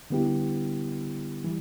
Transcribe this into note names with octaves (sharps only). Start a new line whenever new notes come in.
D3 G3 B3 E4 G4
E3 G3